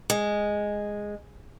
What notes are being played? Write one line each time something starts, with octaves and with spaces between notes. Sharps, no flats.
G#3